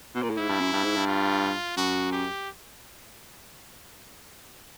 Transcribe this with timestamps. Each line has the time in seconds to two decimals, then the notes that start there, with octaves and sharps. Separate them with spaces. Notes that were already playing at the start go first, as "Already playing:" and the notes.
0.15 B2
0.23 A#2
0.30 A2
0.37 G#2 E4
0.49 G2
0.60 F#2
0.73 G2
0.84 G#2
0.96 G2
1.07 F4
1.77 F#2 F#4
2.13 G4